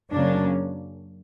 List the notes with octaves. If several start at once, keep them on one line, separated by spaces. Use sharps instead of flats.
F#2 C#3 F#3 A#3 C#4 D4